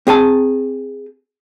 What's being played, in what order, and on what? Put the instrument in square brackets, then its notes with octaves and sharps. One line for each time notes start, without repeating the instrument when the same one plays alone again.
[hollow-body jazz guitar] C4 G#4 G#5 A5